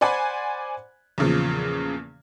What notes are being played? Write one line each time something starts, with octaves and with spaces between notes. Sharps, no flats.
C5 D5 F#5 G#5 B5
E2 A#2 C#3 F3